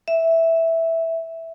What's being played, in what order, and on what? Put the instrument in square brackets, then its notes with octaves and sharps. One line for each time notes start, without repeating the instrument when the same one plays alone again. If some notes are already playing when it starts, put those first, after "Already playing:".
[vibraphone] E5